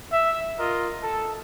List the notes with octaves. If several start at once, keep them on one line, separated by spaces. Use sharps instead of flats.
E5
F4 A#4 D#5
A4